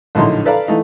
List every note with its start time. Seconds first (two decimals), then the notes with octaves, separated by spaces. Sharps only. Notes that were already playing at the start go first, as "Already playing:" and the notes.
0.15 A#1 A2 D3 F#3 D#4 C6
0.45 A4 B4 D5 F5 A#5
0.68 E3 A3 D#4